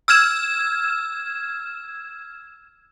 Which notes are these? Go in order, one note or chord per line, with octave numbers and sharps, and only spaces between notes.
E6 F6 G#6 E7